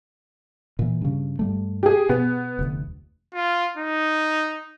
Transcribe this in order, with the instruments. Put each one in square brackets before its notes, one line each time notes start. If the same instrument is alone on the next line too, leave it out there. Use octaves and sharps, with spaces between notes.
[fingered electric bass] A#2 E3
G2 C#3
G2 G3 A3
[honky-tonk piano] G4 G#4
[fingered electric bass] B2 [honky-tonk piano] B3
[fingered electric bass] F1 D2
[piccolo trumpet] F4
D#4